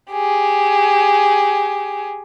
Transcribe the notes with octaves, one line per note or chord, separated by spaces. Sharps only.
G4 G#4